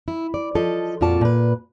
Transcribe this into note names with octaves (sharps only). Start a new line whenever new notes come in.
E4
D5
F3 A4 D#5
F2 A#2 F4 F#4 D5 A5
A#2 B4